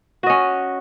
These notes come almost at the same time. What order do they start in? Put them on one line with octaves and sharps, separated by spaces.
F#4 D#5 C#4